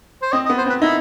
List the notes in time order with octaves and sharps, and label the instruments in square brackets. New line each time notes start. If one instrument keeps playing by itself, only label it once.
[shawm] C5
[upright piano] C4 [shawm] D#5
[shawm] D#5
[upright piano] B3
[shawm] C5
[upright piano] C4 [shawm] B4
[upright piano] D#4 [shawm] E4